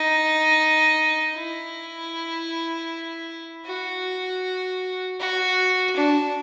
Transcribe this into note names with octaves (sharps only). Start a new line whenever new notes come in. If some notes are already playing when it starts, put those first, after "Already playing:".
Already playing: D#4
E4
F#4
F#4
D4